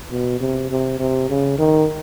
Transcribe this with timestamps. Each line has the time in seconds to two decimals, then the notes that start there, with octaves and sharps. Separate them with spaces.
0.11 B2
0.40 C3
0.70 C3
0.99 C3
1.29 C#3
1.58 D#3